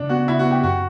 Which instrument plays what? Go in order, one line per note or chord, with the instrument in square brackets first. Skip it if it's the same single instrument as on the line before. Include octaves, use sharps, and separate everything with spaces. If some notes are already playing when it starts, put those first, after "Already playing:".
Already playing: [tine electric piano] C#3 [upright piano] D4
[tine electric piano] B3 [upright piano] F#4
[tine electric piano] C#3 [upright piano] E4
[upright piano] F#4
[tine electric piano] B3
[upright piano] G4
[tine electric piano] F#2 [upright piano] F#4